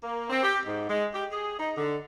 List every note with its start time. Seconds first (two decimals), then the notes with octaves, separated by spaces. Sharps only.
0.03 A#3
0.30 C4
0.43 G4
0.65 G#2
0.88 G#3
1.14 G4
1.31 G#4
1.59 D#4
1.77 D3